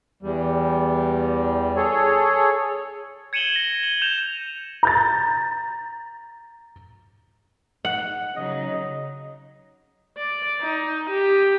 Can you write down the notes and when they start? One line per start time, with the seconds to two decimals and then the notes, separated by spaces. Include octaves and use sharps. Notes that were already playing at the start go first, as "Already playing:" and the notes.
0.23 E2 G3
1.76 G#4 A4 C#5
3.33 G#6 C#7 D#7 E7 F#7 G7
3.56 A#6
3.83 F#7 G7
4.02 G6 E7 F7
4.83 A#5 G6 A6
7.85 F#5
8.36 C#3 F#3 D#4 D#5
10.17 D5
10.62 D#4
11.10 G4